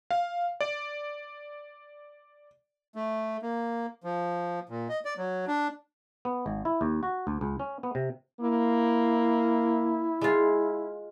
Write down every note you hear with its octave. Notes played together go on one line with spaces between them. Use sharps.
F5
D5
A3
A#3
F3
A#2
D#5
D5
F#3
D4
B3
G#1
E4
D#2
F#4
D2
C#2
C#4
B3
C3
A#3 E4
G#3 F4